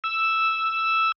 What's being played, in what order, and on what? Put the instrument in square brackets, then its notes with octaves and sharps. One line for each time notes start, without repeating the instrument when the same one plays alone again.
[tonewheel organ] E6